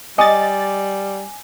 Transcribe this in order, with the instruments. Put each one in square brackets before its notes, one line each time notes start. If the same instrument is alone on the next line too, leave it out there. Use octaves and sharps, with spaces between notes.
[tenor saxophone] G3 [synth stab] D#5 A6 [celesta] G#5 D6